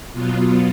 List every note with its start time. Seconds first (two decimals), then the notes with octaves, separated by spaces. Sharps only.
0.12 B2 F#3 B3 F4